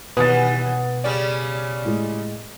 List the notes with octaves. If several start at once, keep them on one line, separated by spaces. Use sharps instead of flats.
D#2 B2 E3 B4 F#5 G#5 D#6 A6
C#3 G3 C#4 D5
A2 G#3